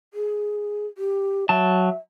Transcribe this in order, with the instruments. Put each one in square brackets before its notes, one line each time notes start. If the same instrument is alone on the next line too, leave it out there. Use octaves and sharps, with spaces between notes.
[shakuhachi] G#4
G4
[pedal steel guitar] F#3 A5 [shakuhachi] E5